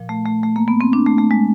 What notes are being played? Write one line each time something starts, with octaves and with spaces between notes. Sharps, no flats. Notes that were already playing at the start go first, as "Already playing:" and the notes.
Already playing: A#2 F3
A3
A3
A3
A#3
B3
C4
D4
A3
A3
G#3